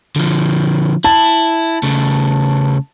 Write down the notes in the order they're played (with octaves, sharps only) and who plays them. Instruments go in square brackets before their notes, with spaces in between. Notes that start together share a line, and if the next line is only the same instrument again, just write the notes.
[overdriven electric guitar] D3 F3
[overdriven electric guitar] E4 [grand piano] A5
[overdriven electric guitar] C#3 A3